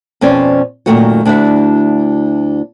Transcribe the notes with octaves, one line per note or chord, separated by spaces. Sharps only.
F2 B2 C#4 C5 D5
F#2 A#2 D#3 A3 D#4 F#4
D2 D4 E4 F#4 E5